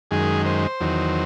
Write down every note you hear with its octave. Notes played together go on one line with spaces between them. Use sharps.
F#2 D#3 G#3 G#4
C5
E2 D#3 F#3